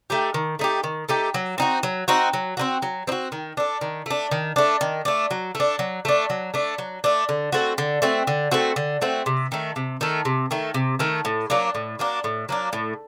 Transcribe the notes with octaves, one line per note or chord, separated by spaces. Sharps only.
A3 D#4 G4
D#3
A3 D#4 G4
D#3
A3 D#4 G4
F#3
C4 D#4 F#4
F#3
C4 D#4 F#4
F#3
C4 D#4 F#4
F#3
C4 D#4 F#4
D#3
A3 D4
D#3
A3 D4
D#3
A3 D4
D#3
A3 D4
F#3
A3
D4
F#3
A3 D4
F#3
A3 D4
F#3
A3 D4
D3
A3 C4 F#4
D3
A3 C4 F#4
D3
A3 C4 F#4
D3
A3 C4 F#4
C3
D#3 A3
C3
D#3 A3
C3
D#3 A3
C3
D#3 A3
A2
F#3 A#3 D4
A2
F#3 A#3 D4
A2
F#3 A#3 D4
A2